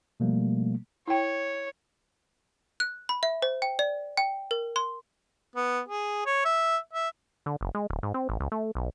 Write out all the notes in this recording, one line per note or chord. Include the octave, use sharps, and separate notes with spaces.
B2 F3 G3 A3 A#3
E4 C#5 G5
F#6
B5
E5
C5
G5
D5
G5
A#4
C6
B3
G#4
C#5
E5
E5
D3
F#1
G#3
D1
G#2
C4
A1
C#2
A3
B1